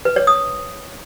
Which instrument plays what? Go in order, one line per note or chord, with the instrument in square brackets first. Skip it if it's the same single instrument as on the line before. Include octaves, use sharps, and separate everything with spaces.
[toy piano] B4
C#5
D#6